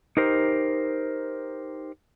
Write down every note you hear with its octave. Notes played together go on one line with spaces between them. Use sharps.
D#4 G4 A#4 C5